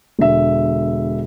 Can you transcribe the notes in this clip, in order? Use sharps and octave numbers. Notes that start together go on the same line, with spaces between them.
E1 D3 E5